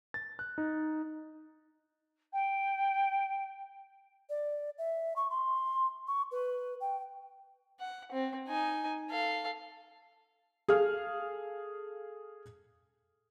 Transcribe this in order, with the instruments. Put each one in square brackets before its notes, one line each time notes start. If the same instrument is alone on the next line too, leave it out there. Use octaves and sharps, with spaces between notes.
[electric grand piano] A6
F#6
D#4
[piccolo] G5
[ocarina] D5
E5
C#6
C6
C#6
B4
G5
[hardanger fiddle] F#5
C4
D#4 G#5
A4 F5
[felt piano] G#4 A4 F5 F6